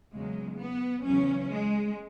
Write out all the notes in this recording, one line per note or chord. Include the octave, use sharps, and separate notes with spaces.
E2 C#3 F#3 G#3
B3
E2 C#3 F#3 C#4
G#3